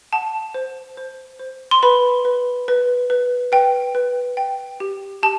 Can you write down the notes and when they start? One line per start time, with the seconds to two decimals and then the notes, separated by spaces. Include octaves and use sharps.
0.13 F#5 A5
0.54 C5
0.97 C5
1.39 C5
1.71 C6
1.83 B4 B5
2.25 B4
2.68 B4
3.10 B4
3.52 B4 G5
3.95 B4
4.37 G5
4.80 G4
5.23 G4 A5